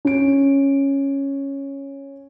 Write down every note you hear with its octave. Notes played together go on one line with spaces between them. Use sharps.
C#4 D7